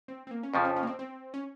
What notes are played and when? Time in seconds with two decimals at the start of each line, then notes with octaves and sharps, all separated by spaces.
0.08 C4
0.27 C4
0.31 A#3
0.43 C#4
0.53 F2 C#3 F3 C4
0.65 C#4
0.76 C#4
0.83 A#3
0.87 C4
0.99 C4
1.34 C#4